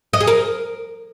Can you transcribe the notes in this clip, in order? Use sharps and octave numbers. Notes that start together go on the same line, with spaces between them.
D#5
G#4
A#4